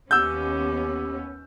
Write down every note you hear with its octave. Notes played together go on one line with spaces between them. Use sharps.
D#2 B3 C#4 G4 E6 G6